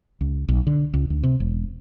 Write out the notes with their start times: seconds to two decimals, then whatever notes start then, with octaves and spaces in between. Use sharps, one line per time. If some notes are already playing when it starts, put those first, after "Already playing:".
0.21 C#2
0.48 B1
0.67 D3
0.94 C#2
1.10 D2
1.23 C3
1.40 E1